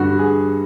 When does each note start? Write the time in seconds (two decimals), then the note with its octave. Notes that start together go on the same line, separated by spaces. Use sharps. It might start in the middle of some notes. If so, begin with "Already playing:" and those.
Already playing: G2 D3 F#4
0.19 G#4